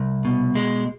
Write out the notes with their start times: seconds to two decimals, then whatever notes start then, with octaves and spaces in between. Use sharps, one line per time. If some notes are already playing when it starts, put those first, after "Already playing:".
Already playing: C2
0.25 B2
0.55 G#3